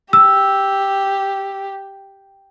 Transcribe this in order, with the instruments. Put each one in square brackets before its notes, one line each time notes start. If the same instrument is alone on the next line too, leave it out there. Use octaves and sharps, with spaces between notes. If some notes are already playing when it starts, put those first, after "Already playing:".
[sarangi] G4 [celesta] E6